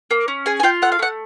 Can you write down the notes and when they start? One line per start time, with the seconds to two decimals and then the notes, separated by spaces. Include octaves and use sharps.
0.11 A#3
0.28 C#4
0.46 G#4 G#5
0.60 G#5
0.63 F4 G5
0.82 A3 F#5
0.92 F5
0.99 A3 F#5